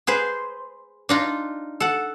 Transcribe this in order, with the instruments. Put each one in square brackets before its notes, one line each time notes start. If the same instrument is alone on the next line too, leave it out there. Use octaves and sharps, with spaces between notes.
[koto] G#4 B4 C5
D4 D#4 F4
A4 F#5